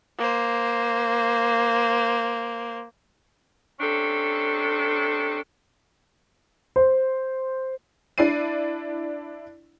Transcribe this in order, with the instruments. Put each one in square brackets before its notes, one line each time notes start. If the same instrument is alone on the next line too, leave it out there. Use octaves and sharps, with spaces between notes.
[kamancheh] A#3 C5
[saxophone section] C3 C#4 D4 A4
[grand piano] C5
[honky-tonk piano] D4 E4 D5 C7 D#7